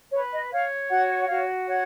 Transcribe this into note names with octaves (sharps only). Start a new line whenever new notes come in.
B4 C#5
D#5
C#5 F5
F#4 F#5
F#5
F#4 F5
C#5 F#5